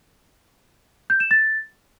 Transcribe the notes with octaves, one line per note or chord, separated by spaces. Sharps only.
G6
E7
A6